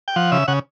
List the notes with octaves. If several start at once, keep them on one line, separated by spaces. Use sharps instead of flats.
G5
F3 F#5
C#3 E5
C#3 F#5